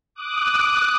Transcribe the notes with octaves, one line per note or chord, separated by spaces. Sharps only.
D6 D#6 F#6